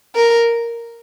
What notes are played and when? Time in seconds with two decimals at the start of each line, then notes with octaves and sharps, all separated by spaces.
0.15 A#4